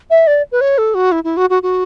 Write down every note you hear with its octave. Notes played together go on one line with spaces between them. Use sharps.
E5
D5
B4
C#5
A4
F#4
E4
E4
F#4
F#4
F#4